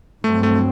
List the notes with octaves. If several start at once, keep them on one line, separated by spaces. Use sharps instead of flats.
G2 F#3 A3 C4
A3